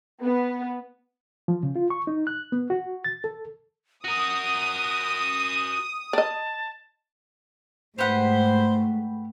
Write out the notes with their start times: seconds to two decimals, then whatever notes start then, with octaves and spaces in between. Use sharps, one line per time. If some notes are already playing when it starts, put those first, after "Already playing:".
0.22 B3
1.48 F3
1.63 C#3
1.76 F4
1.90 C#6
2.07 D#4
2.27 F#6
2.52 B3
2.70 F#4
3.05 A6
3.24 A4
4.04 F#4 A#4 D#6 D#7
6.13 D5 D#5 A5
7.98 G#2 A3 G4 B4 C5 F#5